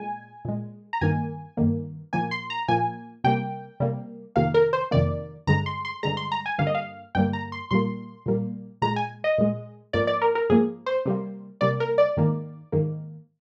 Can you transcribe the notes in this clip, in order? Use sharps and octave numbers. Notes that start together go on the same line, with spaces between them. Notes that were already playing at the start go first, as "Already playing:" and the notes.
Already playing: A#2 G#3 G#5
A#2 G#3
A#5
G2 D#3 A#3 G#5
G2 D#3 A#3
A#2 F3 A#3 G#5
C6
A#5
A#2 F3 A#3 G#5
C3 G3 A#3 G5
C3 G3 A#3
F2 C3 D#3 A#3 F5
A#4
C5
F2 C3 D#3 A#3 D5
G2 D3 G#3 A#5
C6
C6
G2 D3 G#3 A#5
C6
A#5
G#5
G2 D3 G3 A#3 F5
D#5
F5
G2 D3 G3 A#3 G5
A#5
C6
A#2 G3 A#3 C6
A#2 G3 A#3
A#2 G#3 A#5
G#5
D#5
A#2 G#3
G#2 F3 A#3 D5
D5
A#4
A#4
G#2 F3 A#3 G#4
C5
C3 G3 A#3
C3 G3 A#3 D5
A#4
D5
G#2 D#3 A#3
G#2 D#3 A#3